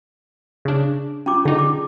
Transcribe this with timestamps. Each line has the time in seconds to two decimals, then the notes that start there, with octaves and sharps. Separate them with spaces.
0.65 C#3 D4
1.26 C#4 F4 D6
1.45 D3 D#4 G#4
1.59 D6